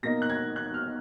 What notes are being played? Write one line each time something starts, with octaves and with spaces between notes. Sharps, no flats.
B2 A#3 D#4 A#6
F#6
G#6
F#6
F6